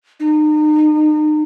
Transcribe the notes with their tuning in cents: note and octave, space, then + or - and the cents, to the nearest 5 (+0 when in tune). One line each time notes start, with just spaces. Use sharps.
D#4 -35